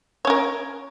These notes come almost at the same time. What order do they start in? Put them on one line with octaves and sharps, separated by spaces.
C#5 C#4 A#4